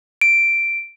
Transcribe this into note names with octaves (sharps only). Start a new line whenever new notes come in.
D7